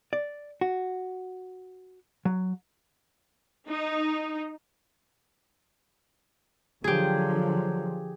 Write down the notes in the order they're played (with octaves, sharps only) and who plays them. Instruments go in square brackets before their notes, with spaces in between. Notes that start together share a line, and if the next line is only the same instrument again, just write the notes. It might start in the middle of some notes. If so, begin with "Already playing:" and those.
[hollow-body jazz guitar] D5
F#4
F#3
[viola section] D#4
[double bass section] D3 F3 [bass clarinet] F#3 [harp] G4 G#4